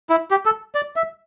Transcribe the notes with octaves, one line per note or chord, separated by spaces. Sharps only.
E4
G4
A4
D5
E5